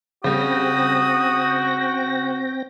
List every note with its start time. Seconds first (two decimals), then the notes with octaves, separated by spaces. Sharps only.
0.24 C#3 G3 C4 F#4 G5 D#6 A#6